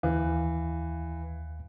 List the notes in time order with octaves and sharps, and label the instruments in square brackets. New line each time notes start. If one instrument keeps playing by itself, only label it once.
[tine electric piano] D#2 F5 [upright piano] E3